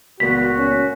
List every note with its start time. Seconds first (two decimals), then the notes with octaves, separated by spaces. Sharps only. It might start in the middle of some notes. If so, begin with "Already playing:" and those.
0.20 C#2 A#2 B3 F#4 B6
0.58 C#4